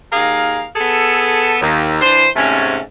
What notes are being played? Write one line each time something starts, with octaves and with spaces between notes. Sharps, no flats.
D#2 G#4 A#4 F5
B3 G#4 A4
D#2
E3 D4 C5
G#2 C3 A3 C#4